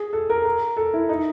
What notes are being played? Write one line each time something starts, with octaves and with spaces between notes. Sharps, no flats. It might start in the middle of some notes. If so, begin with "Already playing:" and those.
Already playing: G#4
A4
A#4
A#4
A4
E4
D#4